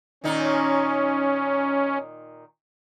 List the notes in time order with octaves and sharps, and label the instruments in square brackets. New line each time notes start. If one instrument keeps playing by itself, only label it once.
[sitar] A#2 D#3 D#4 [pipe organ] C#4